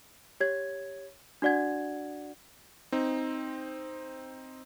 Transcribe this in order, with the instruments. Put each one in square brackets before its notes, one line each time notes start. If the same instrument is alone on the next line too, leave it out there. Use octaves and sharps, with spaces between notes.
[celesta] G4 C#5 G#6
D4 F#4 D5 F#5 G#6
[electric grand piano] C4 D#4